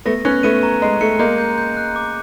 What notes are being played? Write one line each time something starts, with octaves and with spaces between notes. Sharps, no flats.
A3 B3 A#6
B3 C#4 F#6
A3 B3 D#7
A#5
G#3 A#5
A3 C#7
G#3 A#3 G6
G6
G6
F#6
D6